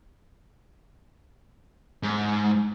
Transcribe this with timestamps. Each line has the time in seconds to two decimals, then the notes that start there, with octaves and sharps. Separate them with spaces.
2.03 G#2